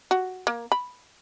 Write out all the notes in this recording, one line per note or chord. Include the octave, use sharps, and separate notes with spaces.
F#4
A#3
B5